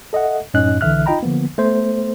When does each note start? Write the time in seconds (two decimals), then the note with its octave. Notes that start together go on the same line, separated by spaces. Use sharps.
0.13 A4 D#5 E5 F#5
0.54 F#2 A2 C#4 D#4 D#5 F#6
0.81 B1 D3 E3 E5 F6 F#6
1.06 D#4 F4 D#5 G5 A#5 B5
1.23 D3 F3 A#3 B3
1.58 A3 B3 C5